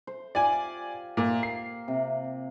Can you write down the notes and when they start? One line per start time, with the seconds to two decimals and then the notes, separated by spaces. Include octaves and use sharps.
0.07 C5
0.35 F4 G4 D5 G#5
1.17 A#2 A#3
1.43 C7
1.88 C3